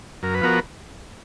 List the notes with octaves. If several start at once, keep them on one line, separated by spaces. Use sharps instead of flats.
F#2 A#4
B4
F3 B3 F#4 A#4